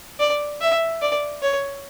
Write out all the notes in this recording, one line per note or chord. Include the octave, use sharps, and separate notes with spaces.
D5
E5
D5
C#5